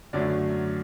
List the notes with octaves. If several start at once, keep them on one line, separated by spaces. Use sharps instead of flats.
F#2 D3 F#3 A3 D5